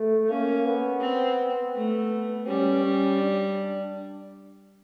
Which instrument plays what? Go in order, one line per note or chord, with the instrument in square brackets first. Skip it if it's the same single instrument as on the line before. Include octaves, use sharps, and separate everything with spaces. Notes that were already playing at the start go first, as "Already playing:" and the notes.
Already playing: [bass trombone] A3
[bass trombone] A#3 [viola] C#4
[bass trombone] B3
[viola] C4
A3
[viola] G3 [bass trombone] C#4
[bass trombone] C#4
D4